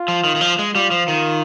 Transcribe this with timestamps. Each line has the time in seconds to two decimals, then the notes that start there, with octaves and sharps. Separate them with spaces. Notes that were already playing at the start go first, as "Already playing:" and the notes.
Already playing: F4
0.08 F3
0.24 D#3
0.36 D#3
0.41 F3
0.59 G#3
0.75 G3 F4
0.91 F3
1.08 D#3